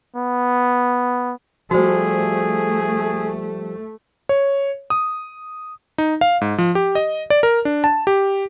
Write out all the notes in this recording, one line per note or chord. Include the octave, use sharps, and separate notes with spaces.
B3
F3 G3 A3 F#4 G#4 C5
C#5
D#6
D#4
F5
G#2
F3
G4
D#5
D5
A#4
D4
A5
G4